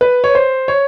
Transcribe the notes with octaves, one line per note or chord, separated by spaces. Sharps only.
B4
C#5
C5
C#5